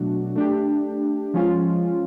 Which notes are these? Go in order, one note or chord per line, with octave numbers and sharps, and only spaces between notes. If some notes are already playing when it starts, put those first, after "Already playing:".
Already playing: B2 F#3 A3 D4 F#4
A3 D4 G4
F3 G#3 C#4 F4